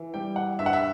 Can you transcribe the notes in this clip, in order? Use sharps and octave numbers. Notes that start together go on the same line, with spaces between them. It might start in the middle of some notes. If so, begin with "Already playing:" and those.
Already playing: E3
G3 G5
F#5
G2 E5
F#5
E5